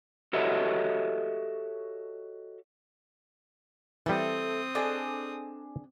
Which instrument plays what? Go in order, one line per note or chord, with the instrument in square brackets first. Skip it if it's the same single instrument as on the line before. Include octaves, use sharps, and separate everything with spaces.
[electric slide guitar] F#4 G4 A4 C#5 D#5 E5
[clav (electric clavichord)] E3 G3 [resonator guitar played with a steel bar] A3 A4 [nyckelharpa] C4 D#6
[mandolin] D4 G#4 [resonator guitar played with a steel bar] A4 D#5